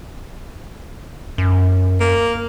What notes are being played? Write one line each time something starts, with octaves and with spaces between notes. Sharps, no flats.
F#2
A#3